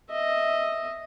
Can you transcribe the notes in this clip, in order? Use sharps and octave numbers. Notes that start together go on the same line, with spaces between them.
D#5 E5